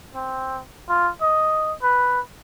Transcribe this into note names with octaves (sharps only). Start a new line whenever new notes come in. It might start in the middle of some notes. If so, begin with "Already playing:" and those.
C4
F4
D#5
B4